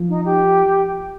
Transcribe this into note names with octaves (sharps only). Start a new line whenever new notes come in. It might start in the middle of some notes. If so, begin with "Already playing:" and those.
Already playing: F3
D#4
G4